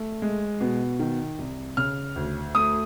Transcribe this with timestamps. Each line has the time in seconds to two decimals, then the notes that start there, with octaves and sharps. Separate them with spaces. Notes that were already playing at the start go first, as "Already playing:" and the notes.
Already playing: A3
0.22 G#3
0.60 B2
1.00 D#3
1.38 C2
1.77 C#3 F6
2.16 D2
2.55 A3 D#6